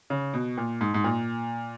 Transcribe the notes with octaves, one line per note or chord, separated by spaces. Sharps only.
C#3
B2
A#2
G#2
G#2
A#2